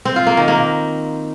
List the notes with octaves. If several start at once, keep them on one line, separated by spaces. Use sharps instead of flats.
C4
F4
A#3
D#3
A#3